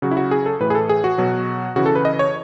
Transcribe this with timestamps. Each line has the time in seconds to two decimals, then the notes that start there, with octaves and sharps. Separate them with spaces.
0.02 C#3 F#3 F#4
0.11 E4
0.17 F#4
0.31 G#4
0.46 A4
0.60 A2 E3 B4
0.70 G#4
0.75 A4
0.89 G#4
1.04 F#4
1.18 B2 F#3
1.76 C#3 E3 F#4
1.86 A4
1.95 B4
2.05 D#5
2.19 C#5